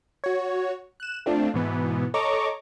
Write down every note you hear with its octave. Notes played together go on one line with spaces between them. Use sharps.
F#4 C#5
F#6 E7
A3 C4 D4 F4
G#2 B2 E3 B3
A4 C#5 D#5 A#5 C#6 D6